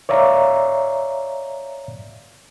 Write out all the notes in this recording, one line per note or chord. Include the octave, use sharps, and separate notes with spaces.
C#5 D5 E5 F5 A#5